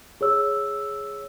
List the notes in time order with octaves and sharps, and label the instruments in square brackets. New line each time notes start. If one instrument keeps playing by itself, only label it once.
[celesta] G#4 C#5 E6